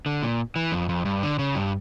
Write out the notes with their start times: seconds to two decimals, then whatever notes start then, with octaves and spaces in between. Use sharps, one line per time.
0.06 D3
0.23 A#2
0.56 E3
0.72 F2
0.89 F2
1.05 G2
1.23 D3
1.39 C#3
1.55 G2